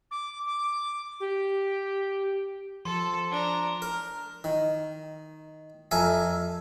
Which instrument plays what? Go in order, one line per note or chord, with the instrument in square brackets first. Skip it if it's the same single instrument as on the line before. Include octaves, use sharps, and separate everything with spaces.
[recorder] D6
D6
G4
[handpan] F3 [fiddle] A4 [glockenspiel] C6
[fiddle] D4 A#5
[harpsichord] A#4
D#3
F2 A4 A#4 E5 G#5